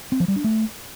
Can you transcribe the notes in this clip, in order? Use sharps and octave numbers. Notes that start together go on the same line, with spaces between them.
C4
F3
G3
D4
A3